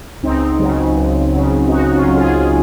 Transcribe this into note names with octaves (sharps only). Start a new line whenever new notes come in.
C#2 C4 D#4
C#3 F#3
C#2
C#3 F#3
C#2 D#4 F#4
C#4 F4
C#3 F#3
F4 G#4